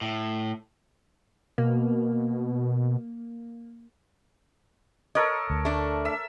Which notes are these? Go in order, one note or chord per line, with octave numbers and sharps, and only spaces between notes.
A2
B2 A#3
A4 A#4 C#5 D#5
D2
A3 D4
E5 E6